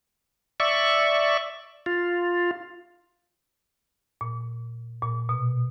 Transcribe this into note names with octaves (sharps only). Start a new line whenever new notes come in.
D5 E5 C#6
F4
A#2
A#2
B2